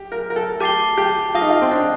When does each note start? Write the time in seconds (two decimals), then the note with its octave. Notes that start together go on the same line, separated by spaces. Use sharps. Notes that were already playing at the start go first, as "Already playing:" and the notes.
Already playing: G4
0.12 A#4
0.30 A#4
0.36 A4
0.60 G4 A5 D6 A6 C7 G7
0.97 G4
1.34 F4 A5 D#6 A#6
1.42 D#4
1.50 F4
1.62 C4
1.71 D4